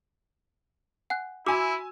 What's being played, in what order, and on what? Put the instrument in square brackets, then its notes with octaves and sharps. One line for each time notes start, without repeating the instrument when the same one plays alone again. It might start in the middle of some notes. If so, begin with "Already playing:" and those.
[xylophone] F#5 G#5 F#6
[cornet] E4 [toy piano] F#4 [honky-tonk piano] G#5 E6 [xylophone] D6